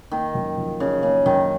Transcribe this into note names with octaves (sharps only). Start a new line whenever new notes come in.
D#3 A#3
F#2
F3
C#3 D#4
C#3 A#3
F#2 D#3